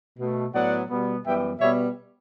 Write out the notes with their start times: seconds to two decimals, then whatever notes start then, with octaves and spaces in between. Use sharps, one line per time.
0.18 B2 A3
0.54 A2 F#3 B3 D5 F#5
0.89 B2 G3 B3
1.24 F#2 E3 G3 B3 E5 G5
1.59 B2 G3 B3 C#5 E5